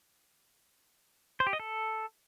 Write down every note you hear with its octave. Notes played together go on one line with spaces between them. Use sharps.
C5
G4
D#5
A4